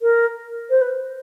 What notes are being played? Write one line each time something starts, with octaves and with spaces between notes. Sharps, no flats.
A#4
C5
B4